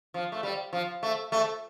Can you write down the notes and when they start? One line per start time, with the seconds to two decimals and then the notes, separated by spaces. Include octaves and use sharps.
0.14 F3
0.32 A3
0.43 G3
0.73 F3
1.03 A3
1.32 A3